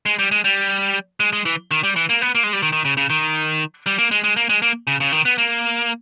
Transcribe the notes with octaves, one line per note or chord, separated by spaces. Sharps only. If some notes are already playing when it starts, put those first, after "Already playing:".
G#3
G3
G#3
G3
G#3
G#3
E3
D#3
G3
E3
A#3
B3
A#3
G#3
G3
D#3
D#3
C#3
C#3
D#3
G3
A#3
G#3
G#3
A#3
G#3
A#3
C#3
C#3
D#3
B3
A#3